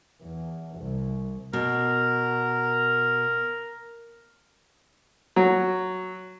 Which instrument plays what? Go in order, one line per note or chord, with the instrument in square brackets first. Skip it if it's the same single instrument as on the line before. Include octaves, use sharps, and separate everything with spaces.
[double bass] E2
C2
[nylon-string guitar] B2 [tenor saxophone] A#4
[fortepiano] F#3